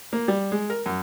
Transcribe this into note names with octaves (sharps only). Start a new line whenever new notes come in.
A#3
G3
G#3
A#4
F#2